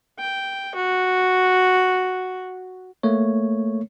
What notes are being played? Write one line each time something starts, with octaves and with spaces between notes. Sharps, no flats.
G5
F#4
A3 A#3 C#5